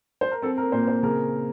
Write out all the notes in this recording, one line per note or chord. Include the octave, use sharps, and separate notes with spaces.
C5
A#4
C4 A4
A#4
A#2 C5
C5
C#3 A#4